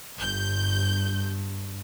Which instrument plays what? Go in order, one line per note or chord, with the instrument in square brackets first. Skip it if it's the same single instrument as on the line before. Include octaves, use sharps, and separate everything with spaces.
[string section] G1 G6 [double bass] G2